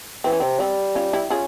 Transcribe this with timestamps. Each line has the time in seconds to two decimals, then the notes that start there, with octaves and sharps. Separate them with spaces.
0.24 E3 C4
0.32 C#4
0.40 C3 C4
0.60 G3 C4
0.95 C#4 F4
1.13 E4 G4
1.30 C#4 F4 G#4